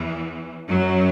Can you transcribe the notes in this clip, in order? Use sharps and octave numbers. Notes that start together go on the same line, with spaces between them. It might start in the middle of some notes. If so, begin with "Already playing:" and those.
Already playing: E2 E3
F#2 F#3